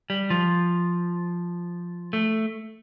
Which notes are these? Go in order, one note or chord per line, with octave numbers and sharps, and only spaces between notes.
G3
F3
A3